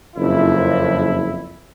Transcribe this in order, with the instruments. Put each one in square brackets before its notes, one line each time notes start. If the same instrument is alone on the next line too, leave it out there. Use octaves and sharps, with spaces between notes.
[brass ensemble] F#1 F2 E4